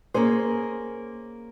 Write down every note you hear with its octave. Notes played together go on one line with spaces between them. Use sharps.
A#3 C#4 G#4 C5